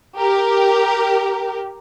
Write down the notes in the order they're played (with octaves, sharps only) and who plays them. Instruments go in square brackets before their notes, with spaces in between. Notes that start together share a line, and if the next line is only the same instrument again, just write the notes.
[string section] G4 A#4